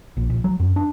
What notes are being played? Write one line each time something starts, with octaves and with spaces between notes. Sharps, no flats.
A#1
A#1
F#3
F#2
D4